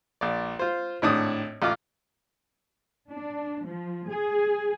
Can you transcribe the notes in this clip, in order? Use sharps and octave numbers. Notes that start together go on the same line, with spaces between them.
A#1 D5
F4 C5
G#1 A2 D4 D#6
A1 F4 D6
D4
F3
G#4